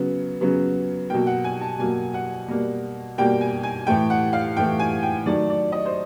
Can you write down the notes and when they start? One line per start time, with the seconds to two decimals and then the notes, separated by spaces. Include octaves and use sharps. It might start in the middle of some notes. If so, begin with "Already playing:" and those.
Already playing: C#3 F#3 B3
0.41 C#3 F#3 B3
1.10 B2 F#3 A#3 G5
1.26 F#5
1.44 G#5
1.61 A5
1.79 B2 F#3 A#3 G#5
2.14 F#5
2.48 B2 G3 A#3
3.18 B2 G3 A#3 G5
3.41 G#5
3.63 G#5
3.87 A2 E3 A3 G5
4.10 F#5
4.33 F5
4.57 A2 E3 A3 G5
4.80 G#5
5.03 G5
5.26 D#3 F#3 A3 D5
5.50 D5
5.72 D#5
5.86 C5